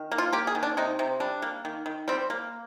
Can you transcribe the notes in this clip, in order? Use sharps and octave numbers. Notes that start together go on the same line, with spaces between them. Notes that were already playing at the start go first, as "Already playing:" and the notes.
Already playing: D#3
A#3
F4
A#3 G4
G#4
D#3
D4
C3 D#4
C3
G3 D4
A#3
D#3
D#3
G3 C4
A#3